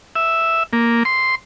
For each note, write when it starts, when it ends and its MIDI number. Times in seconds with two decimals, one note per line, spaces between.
0.16 0.63 76
0.73 1.03 58
1.05 1.35 84